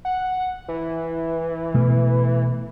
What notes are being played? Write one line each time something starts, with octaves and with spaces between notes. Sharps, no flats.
F#5
E3
B2 A3